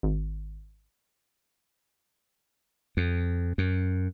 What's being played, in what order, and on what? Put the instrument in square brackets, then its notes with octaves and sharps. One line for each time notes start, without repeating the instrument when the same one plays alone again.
[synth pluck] G#1
[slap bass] F2
F#2